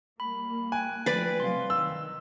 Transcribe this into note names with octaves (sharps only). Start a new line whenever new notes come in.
G3 A#3 B5
G5 G#5 F#6
F3 A3 B4 D5
C3 F#3 G3 F5 C6
D#3 E6